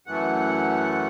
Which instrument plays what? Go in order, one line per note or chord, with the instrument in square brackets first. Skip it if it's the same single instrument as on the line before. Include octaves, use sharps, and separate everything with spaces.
[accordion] F#2 E3 A3 F#5